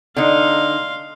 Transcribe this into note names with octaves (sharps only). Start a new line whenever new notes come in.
D3 D#4 F5 C6